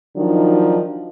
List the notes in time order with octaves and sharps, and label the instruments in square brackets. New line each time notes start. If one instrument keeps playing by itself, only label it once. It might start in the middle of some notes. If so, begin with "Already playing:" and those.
[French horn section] D#3 F3 F#3 D4 D#4